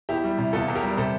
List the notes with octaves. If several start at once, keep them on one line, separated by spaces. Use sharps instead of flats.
E2 E4 G4
G3
C3
E2 F4 A4
E2
G4 A#4
G3
C3 A4 C5